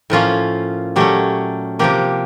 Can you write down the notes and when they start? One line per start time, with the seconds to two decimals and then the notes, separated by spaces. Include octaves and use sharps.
0.10 A2 F3 A#3 C#4 F4
0.96 A#2 F#3 A3 C#4 G4
1.79 C3 F3 A#3 G4